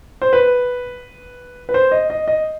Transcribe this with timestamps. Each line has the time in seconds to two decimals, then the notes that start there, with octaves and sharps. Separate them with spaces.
0.22 C5
0.33 B4
1.69 B4
1.74 C5
1.92 D#5
2.10 D#5
2.28 D#5